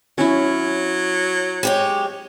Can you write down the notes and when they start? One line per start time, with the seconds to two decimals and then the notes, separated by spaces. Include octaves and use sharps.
0.18 F#3 C#4 E4
1.63 G#3 G4 C#5